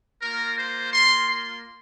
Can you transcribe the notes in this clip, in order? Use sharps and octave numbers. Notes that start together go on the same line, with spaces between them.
A#3 F4 A#4
C5
C6
C6